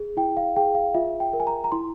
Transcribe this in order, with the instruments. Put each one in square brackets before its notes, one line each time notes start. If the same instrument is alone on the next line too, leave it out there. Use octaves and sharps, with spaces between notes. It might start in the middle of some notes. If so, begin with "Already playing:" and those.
Already playing: [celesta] G#4
E4 G5
F5
G#4 G5
F5
F4 E5
G5
A#4
G#5
A#5
A#5
E4 C6